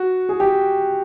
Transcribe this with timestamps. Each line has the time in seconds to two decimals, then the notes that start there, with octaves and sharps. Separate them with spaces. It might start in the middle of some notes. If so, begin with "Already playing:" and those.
Already playing: F#4
0.29 G#4
0.40 G4